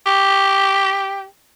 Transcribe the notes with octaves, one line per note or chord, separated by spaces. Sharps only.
G4